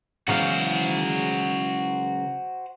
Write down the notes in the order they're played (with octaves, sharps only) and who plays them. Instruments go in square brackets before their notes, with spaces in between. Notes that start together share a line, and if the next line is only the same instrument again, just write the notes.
[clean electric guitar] C#2 F#3 F5 [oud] C#3 E3 B3 [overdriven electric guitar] F#4 C5